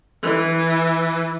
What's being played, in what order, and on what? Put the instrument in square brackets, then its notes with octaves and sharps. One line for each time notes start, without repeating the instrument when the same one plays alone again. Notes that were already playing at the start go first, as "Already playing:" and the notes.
[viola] E3